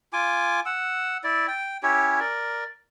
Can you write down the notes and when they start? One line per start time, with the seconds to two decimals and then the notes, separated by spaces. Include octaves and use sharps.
0.13 F4 G#5 D6
0.66 F#5 E6
1.24 E4 D5
1.48 G5
1.83 C#4 E4 G4 C#5
2.20 A#4 D5